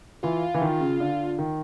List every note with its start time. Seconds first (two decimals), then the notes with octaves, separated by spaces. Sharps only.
0.23 E3 F4
0.54 E3
0.61 D#3
0.81 C#3
1.00 D3
1.39 D#3